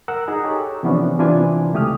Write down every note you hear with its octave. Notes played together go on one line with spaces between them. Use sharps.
A#4 F#5 E6
D#4 G#4 A#5
G4 A4 C#5
C3 E3 F3 B3 C#4 D4
C3 E3 D4 F4 G#5
C#2 A3 G4 D#6 F6